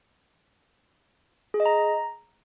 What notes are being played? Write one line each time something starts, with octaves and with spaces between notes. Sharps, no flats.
G#4
D#5
A#5